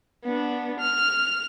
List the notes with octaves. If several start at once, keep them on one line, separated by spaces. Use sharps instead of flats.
B3 D4
F6